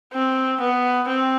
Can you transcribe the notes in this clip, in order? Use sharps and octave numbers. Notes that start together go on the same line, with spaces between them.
C4
B3
C4